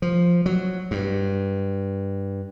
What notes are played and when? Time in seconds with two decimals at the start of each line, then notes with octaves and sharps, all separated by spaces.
0.02 F3
0.46 F#3
0.91 G2